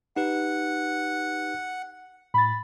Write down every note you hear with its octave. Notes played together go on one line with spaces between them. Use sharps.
D#4 G4 B4 F#5
A2 B5 A6